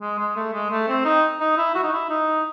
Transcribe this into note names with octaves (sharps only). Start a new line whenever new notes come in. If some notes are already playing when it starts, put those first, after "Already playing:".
G#3
G#3
A3
G#3
A3
C4
D#4
D#4
E4
F#4
D#4
E4
D#4